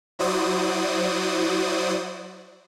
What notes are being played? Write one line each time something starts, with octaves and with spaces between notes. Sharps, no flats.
F#3 E4 F#4 C5 D5 D#6